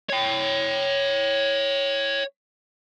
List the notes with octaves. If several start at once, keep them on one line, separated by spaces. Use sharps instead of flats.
C#5 G5